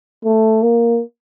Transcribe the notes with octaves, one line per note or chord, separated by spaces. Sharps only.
A3
A#3